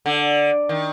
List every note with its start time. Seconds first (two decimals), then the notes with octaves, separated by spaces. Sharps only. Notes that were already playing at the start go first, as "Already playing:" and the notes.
0.06 D3
0.69 D#3